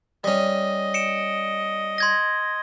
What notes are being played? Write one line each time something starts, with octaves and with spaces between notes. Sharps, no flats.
G3 C#4 D#5
C#7 D7 E7
C6 G#6 A#6